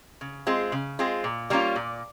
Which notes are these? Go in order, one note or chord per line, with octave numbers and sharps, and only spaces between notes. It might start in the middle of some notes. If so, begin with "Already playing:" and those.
C#3
G#3 C4 F4 G#4
C#3
G#3 C4 F4 G#4
A#2
G3 A#3 C#4 F4
A#2